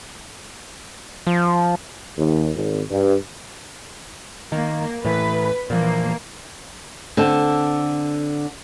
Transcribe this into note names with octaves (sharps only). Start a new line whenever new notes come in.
F3
D#2
G#1
G2
D#3 A#3
A2 E3 B4
A#2 E3 F3 A#3
D3 C4 A4